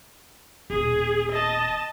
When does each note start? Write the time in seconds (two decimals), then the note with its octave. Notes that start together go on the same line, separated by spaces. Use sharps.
0.70 D#1 B2 G#4
1.33 D#5 A5